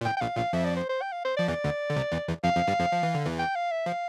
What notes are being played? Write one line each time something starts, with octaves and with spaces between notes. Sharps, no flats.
A#2
A2 G5
G5
A#1 A#2 F5
A#1 A#2 F5
F2 F3 E5
D5
C5
C5
G5
F5
C5
F3 D5
E2 E3 D5
D2 D3
D3
C2 C3
E2 E3
E2 E3
F2 F3 F5
F2 F3
G2 G3
F2 F3
F3
E3
D3
E2 E3
G5
F5
E5
F3 F5